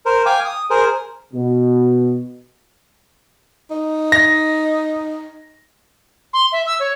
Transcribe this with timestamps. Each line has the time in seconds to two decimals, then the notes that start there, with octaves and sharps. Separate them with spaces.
0.06 A#4 C5
0.26 F5 G5 G#5 D6
0.45 D#6
0.70 G#4 A#4 C5
1.34 B2
3.71 D#4
4.12 A#6
6.33 C6
6.52 E5
6.66 E6
6.80 C#5